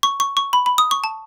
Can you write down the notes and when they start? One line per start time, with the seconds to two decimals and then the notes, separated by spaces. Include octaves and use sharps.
0.03 C#6
0.20 C#6
0.37 C#6
0.53 B5
0.66 B5
0.78 D#6
0.91 C#6
1.04 A5